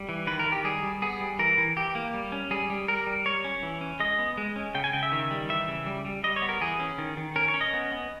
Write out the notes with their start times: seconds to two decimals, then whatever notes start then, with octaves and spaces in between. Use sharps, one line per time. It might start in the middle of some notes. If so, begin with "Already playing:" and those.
Already playing: G3
0.09 E3
0.27 D#3 B4
0.39 A#4
0.46 D#3
0.52 G4
0.64 G3 G#4
0.83 G3
1.02 B3 G#4
1.20 G3
1.39 E3 A#4
1.58 E3
1.76 E3 G4
1.95 A#3
2.14 G3
2.32 C#4
2.51 G3 G#4
2.70 G3
2.88 G3 A#4
3.07 G3
3.26 G3 C#5
3.44 C#4
3.63 E3
3.81 C#4
4.00 G#3 D#5
4.19 B3
4.37 G#3
4.56 C#4
4.75 C#3 G5
4.84 G#5
4.93 C#3 G5
5.03 E5
5.12 D#3
5.31 G3
5.49 E3 E5
5.68 C#3
5.86 G3
6.05 G3
6.24 G3 D#5
6.36 C#5
6.42 B3
6.49 A#4
6.61 E3 G#4
6.80 C#4
6.98 D#3
7.17 D#3
7.36 C#4 A#4
7.48 C#5
7.54 C#4
7.61 D#5
7.74 B3
7.92 B3